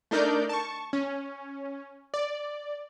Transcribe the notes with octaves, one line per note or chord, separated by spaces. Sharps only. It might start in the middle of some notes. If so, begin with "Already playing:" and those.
A3 D4 D#4 A#4 D5 G6
A5 C#6
C#4
D5